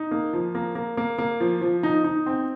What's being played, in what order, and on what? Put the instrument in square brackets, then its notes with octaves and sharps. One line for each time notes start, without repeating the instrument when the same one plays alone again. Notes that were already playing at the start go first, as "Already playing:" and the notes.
Already playing: [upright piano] D#4
A#3
F3
A#3
A#3
A#3
A#3
F3
F3
D#4
D#4
C4